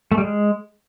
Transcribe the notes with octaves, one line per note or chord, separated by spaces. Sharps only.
A3
G3
G#3